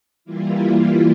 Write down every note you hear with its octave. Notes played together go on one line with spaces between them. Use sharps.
E3 G3 A#3 E4 F4